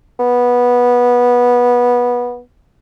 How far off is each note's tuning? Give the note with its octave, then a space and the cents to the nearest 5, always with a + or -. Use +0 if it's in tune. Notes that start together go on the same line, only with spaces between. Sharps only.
B3 -15